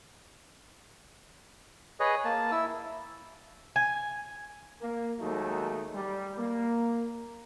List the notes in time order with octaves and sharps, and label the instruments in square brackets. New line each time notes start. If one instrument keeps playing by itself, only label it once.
[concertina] G#4 B4 C#5 D#5
A#3 A5
E4 E6
[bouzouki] G#5
[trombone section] A#3
D#2 F#3 G#3 A3 D#4
G3
A#3